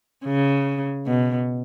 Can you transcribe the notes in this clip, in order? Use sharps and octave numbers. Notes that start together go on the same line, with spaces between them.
C#3
B2